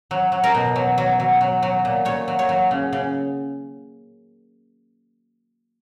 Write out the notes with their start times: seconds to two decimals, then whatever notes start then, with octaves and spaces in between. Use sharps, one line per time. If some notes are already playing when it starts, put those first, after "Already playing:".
0.11 F#3
0.32 F#3
0.44 A#4
0.55 B2
0.76 F#3
0.98 F#3
1.20 F#3
1.41 F#3
1.62 F#3
1.85 A#2
2.05 A#2 C#5
2.28 F#3
2.39 C#5
2.49 F#3
2.71 C#3
2.93 C#3